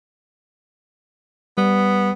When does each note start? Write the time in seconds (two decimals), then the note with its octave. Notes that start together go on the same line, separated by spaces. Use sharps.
1.58 G3 B3